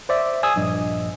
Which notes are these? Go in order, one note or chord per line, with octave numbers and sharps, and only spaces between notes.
C5 D5 E5
G#5 D#6 E6 G#6
A#1 G2 D#5